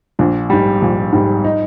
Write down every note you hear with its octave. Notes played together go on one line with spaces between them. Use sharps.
A#1 D4
G#2 G3
A#1
G#2 G3
D#4